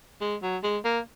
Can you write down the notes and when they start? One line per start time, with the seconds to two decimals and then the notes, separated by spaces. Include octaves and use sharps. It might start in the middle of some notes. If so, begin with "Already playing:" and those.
0.21 G#3
0.42 F#3
0.63 G#3
0.84 A#3